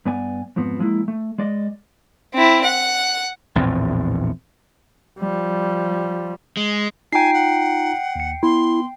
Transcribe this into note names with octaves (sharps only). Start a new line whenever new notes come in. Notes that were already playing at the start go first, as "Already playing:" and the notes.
G2 B3 D5 G#5
F2 G#2 F3 B3 C4
F3 G#3 A#3 E4
A3
G#3 D5 D#5
C4 E4
F#5
A#1 E2 A2 C4
F3 G3
G#3
D#4 F4 G5 G#5 A#5 C7
F#5
D#2 C#7
B3 E4 C6